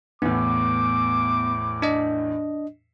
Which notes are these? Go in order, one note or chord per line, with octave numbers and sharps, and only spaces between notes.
E2 A2 B3 D6
D4 D#5